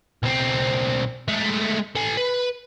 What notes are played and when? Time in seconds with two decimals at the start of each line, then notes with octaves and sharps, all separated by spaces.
0.23 B1 C4
1.28 G#3 A3
1.95 A4 G#5
2.17 B4